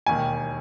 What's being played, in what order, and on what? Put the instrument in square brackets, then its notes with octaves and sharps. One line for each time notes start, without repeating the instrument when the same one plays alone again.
[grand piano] E1 D#2 D#3 G#5